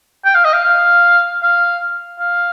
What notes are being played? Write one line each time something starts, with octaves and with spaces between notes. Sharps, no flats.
G5
F5
D#5
F5
F5
F5
F5